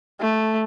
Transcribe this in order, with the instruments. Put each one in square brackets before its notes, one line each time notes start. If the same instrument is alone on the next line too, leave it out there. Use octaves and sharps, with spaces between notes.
[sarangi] A3